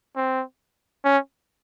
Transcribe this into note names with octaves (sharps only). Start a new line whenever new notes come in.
C4
C#4